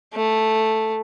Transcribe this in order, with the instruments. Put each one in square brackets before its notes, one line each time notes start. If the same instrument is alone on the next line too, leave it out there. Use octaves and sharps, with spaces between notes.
[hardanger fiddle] A3